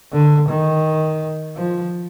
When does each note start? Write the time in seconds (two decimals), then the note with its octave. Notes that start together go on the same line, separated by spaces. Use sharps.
0.13 D3
0.49 D#3
1.57 F3